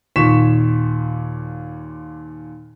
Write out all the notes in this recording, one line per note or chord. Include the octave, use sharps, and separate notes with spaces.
D#2 A#2 C#6 B6 E7